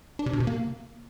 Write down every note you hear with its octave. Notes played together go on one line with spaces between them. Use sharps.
D4
C3
B2
C3
A#3